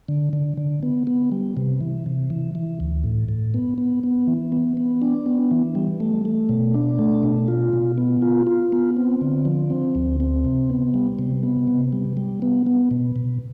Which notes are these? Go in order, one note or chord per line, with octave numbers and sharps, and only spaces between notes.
D3
D3
D3
B3
B3
G3
C3
E3
C3
E3
E3
D2
A2
A2
B3
B3
B3
E3
B3
B3
D4
B3
E3
G3
A3
A3
B2
D4
A3
B2
F4
B2
B3
F4
F4
B3
C4
D3
F3
C4
D2
C4
C3
B3
G3
C3
B3
C3
G3
G3
B3
B3
B2
B2